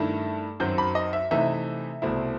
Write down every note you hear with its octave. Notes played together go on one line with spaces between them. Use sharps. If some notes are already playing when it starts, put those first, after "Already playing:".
Already playing: G2 D#3 A3 E4
F#2 D#3 F#3 C4 G6
B5
D#5
E5
C3 E3 A3 D#4 E5
C2 B2 A3 C4 E4